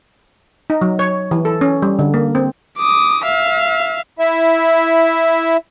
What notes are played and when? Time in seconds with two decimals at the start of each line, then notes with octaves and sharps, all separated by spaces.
0.70 D#4
0.81 F#3
0.99 C#5
1.31 E3
1.45 A4
1.61 C#4
1.82 G3
1.99 D3
2.14 A#3
2.35 C4
2.78 D6 D#6
3.25 E5 F5
4.19 E4 E5